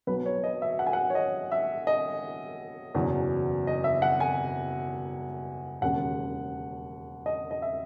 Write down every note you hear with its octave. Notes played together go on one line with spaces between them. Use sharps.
B1 B2 F#3 B4
C#5
D#5
E5
F#5
G#5
F#5
C#5
D#5
E5
D#5
F#1 E2 B2 F#3
D#5
E5
F#5
G#5
E1 D#2 C#3 F#5
D#5
D#5
E5